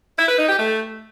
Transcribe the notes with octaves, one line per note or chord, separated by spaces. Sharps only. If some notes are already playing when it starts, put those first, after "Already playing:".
E4
B4
D#4
G4
A3